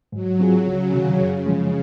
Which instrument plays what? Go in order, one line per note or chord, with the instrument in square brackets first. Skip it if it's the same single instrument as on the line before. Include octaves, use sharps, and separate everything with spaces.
[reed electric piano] G#2 [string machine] F#3
[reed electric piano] F#3 C4 F4 G#4
[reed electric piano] C#2 [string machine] C#3
[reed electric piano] C3 D#3
[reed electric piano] F#2 [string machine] C#3
[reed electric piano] C#3 F3 G#3